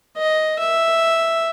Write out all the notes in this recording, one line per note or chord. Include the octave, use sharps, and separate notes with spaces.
D#5
E5